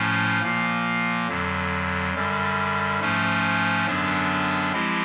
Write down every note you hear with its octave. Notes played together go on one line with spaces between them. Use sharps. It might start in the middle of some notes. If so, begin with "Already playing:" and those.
Already playing: A2 F3 A3 C#4
A#2 F3 A#3
F2 D3 F#3
F#2 D3 G3
G#2 F3 A3 C#4
F#2 D3 F#3 B3 D4
F3 G#3 C4 E4 G4